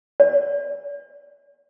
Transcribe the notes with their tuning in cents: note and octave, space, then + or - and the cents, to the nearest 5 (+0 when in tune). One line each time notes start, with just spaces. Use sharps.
D5 -40